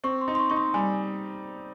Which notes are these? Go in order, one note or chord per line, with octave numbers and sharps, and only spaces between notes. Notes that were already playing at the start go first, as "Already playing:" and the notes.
C4 C#6
C6
D#4
C6
C#6
D#4 C#6
C6
G3 G#5